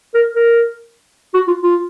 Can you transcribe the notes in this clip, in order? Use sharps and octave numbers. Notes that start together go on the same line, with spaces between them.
A#4
A#4
F#4
F4
F4